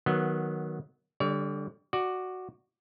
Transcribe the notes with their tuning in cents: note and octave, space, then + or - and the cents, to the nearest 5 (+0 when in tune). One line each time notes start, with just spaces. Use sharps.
D#3 +0 F#3 +0 B3 -15
D3 +0 G3 +20 C#5 +45
F#4 +0 D5 +15